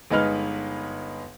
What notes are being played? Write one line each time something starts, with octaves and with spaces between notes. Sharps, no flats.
G1 G#3 D#4 B4 F6